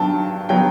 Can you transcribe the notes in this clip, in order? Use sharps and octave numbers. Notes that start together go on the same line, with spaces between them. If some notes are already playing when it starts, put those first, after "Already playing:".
Already playing: G2 F#3 B3 G5 A5
F#3 B3 G5